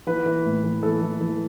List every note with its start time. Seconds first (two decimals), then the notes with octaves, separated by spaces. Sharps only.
0.07 E3 B4
0.26 E3
0.45 A2
0.64 E3
0.83 E3 A4
1.02 E3
1.21 E3